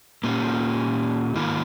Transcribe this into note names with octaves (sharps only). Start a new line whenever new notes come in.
A#2 A#3 C#4 G4
G#2 D#3 A#3 E4 A#4